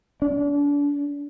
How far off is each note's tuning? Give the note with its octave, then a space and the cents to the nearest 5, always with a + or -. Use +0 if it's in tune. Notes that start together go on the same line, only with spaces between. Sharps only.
D4 -35